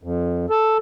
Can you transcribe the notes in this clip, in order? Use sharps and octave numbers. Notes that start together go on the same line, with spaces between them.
F2
A4